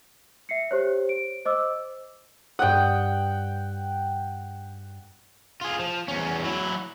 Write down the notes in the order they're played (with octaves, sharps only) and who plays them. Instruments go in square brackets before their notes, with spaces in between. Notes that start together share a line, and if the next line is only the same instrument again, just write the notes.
[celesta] E5 C7 C#7
G4 C5 C#5
D7
C5 D#5 D6 E6
[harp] G2 D#6 [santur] F#5 G5
[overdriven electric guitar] F4 G#4
F3
E2 C#4
F#3 E4